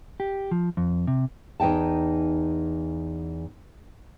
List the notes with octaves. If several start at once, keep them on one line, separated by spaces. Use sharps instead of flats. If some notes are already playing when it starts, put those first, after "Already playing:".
G4
F3
F2
C3
E2 D#4 G5 A5